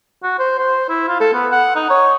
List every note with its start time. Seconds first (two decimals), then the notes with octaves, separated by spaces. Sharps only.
0.23 F#4
0.39 C5
0.59 C5
0.89 E4
1.08 F4
1.20 A4
1.33 B3
1.51 F#5
1.75 D#4
1.90 C#5